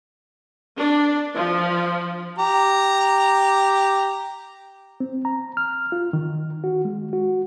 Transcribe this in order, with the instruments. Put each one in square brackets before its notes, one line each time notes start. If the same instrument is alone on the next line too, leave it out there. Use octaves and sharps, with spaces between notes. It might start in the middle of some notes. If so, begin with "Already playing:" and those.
[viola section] D4
F3
[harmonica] G4 A#5
[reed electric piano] C4
A#5
F6
F4
D#3
F#4
G#3
F#4